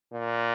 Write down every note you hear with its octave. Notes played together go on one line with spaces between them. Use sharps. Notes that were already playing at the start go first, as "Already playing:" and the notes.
A#2